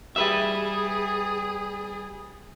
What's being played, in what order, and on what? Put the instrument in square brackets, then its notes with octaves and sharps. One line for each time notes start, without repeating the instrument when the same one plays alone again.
[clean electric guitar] G3 B4 E5 [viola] G#4